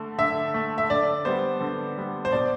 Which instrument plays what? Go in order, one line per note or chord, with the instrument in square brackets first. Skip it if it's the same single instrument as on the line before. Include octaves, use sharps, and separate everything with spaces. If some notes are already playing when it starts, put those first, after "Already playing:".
Already playing: [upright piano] D3 A3
D3 E5
A3
E5
D3 D5
G3 B3 C5
D3
G3 B3
C5
B2 D5